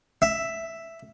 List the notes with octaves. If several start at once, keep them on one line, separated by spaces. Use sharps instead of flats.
E5